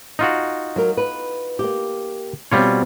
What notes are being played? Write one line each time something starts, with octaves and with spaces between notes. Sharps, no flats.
D#4 F4 F#4
F#3 A#4
B4
A#3 G4
B2 G3 C4 F4 C#5